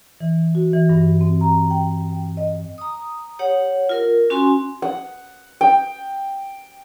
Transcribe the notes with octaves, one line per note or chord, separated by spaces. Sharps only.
E3
F#4
E3
G2
C4
A#5
G5
G5
D#5
A#5 D#6
G4 C#5 F#5
F4 A#4
C#4 F#4 G#5 C6
F#5
G5